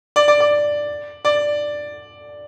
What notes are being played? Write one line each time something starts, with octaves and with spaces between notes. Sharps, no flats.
D5
D5
D5
D5